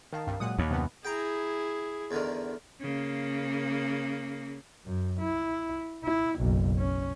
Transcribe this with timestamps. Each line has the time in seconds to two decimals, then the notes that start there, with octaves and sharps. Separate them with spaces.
0.13 D#3 A#4 F5 A5
0.27 C2 G2
0.40 A#2 F#3 G#3 F#5 D#6
0.59 D#2 C#5 B5
0.71 F#2 C3 B3
1.05 E4 G#4 G5 A#5
2.11 E2 D3 D#3
2.81 C#3 A#3
4.85 F#2
5.20 E4
6.04 E4
6.39 F#1 B1
6.78 C#4